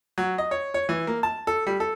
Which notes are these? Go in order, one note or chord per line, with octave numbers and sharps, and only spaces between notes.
F#3
D#5
C#5
C#5
E3
A#3
A5
A4
G3
A4